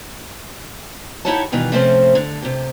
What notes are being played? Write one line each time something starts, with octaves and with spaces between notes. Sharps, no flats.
D#4 E4 G4 C#5 F#5 A5
G2 B2 D#3 E3 F4
C3 F3 A3 C4 C#4 C5
D3
C3 G4